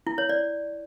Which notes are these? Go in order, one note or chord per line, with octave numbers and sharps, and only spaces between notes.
E4
C#5
D5